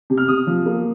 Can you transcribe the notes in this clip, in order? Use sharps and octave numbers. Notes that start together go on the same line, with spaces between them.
C3
F6
C3 D#6
F3
A#3